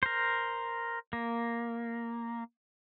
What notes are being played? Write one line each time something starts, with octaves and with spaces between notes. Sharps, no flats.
A#4 C5
A#3